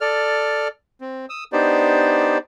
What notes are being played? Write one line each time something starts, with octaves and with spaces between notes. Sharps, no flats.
A4 D5 F6
C4
D#6 E6
B3 D4 D#4 G4 C5 D5